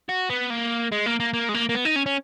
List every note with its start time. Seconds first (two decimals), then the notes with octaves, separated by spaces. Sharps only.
0.09 F#4
0.30 B3
0.50 A#3
0.92 G#3
1.06 A#3
1.20 A#3
1.34 A#3
1.49 G#3
1.54 A#3
1.69 A#3
1.75 B3
1.85 D#4
1.96 C#4
2.06 C#4